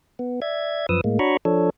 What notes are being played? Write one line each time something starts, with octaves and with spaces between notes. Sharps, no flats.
B3
D5 E5 G#6
F#2 F3 B4 D#6 E6
A2 G#3 A#3
D4 F#4 C#5 A#5 B5 C#6
F3 D4 A4 C#5